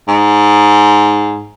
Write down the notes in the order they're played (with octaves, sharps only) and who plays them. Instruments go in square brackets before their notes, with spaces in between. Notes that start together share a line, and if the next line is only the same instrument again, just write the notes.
[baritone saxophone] G#2